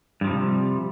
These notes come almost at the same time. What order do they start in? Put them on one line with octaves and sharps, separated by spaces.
G2 F3 G3 C3